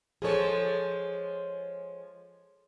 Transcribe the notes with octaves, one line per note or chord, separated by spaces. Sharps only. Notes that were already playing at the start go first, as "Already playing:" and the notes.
F3 G#3 G#4 A4 C#5